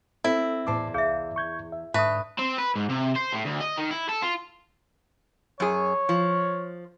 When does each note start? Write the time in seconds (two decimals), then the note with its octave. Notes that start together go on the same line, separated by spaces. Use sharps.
0.24 C4 E4 A4
0.67 E2 A2 C5 D5 A5 D6
0.94 C2 G#4 E5 F5 G6
1.36 C#6 G6 G#6
1.72 E5
1.94 G#2 D3 D#4 B4 E5 C#6 D#6
2.39 C4
2.58 B4
2.76 G#2
2.89 C3
3.16 C5
3.33 A2
3.45 D2
3.60 D#5
3.77 D#3
3.91 E4
4.09 A4
4.22 F4
5.60 F#2 G#4 C#5
6.09 F3